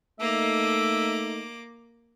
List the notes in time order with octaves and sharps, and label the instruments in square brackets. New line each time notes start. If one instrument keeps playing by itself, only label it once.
[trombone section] A3 D#4 [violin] A#3 D6 [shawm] E5